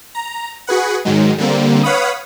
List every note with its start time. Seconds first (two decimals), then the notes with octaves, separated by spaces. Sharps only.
0.15 A#5
0.67 F#4 G#4 B4 F#5
1.05 G#2 D#3 F#3 G#3
1.38 D3 G3 A#3 C4
1.83 B4 C#5 F5 F#5 B5 D#6